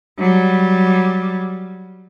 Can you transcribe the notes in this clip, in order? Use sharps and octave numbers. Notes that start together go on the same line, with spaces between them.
F#3 G3